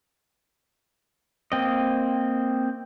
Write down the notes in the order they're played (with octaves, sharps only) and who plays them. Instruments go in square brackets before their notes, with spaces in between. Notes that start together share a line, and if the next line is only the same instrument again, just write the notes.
[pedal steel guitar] A#3 C4 D#5